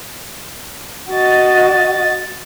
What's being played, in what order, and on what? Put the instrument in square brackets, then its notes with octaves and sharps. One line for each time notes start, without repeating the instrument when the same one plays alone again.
[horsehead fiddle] F#4 D#5 [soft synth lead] A6